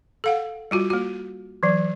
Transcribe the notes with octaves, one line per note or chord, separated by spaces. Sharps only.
A4 F5 F#5
G3 F4 F#4
A#3 F#4
E3 F#3